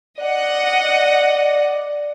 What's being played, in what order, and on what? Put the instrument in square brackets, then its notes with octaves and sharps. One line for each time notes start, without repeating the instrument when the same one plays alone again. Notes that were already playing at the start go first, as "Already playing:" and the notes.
[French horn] D5 [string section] D#5 F#5